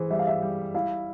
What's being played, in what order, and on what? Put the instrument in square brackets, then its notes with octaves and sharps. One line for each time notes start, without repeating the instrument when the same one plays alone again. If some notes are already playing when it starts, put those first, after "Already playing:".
Already playing: [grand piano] E3 [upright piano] G#4 C5
[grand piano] G3 [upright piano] E5
[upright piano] F5
E5
[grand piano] G3
[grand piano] E4 [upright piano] F5